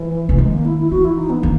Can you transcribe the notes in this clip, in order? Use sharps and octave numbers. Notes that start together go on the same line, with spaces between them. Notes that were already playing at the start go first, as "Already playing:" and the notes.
Already playing: E3
C#3
D#3 G#3
A#3
E4
E4
E3 F#4
E4
D#4
B3
D#3 A#3